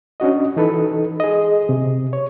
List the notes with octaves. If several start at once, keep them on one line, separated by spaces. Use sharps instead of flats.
C#4 D4 F#4 D#5
E3 D#4 A4 B4
G#4 D#5
C3
C#5